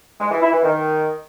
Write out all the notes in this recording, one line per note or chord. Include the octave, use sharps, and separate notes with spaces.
G#3
E3
E4
E3
D#3